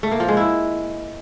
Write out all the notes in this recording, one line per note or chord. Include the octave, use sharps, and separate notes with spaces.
A3
A#3
F3
G#3
E4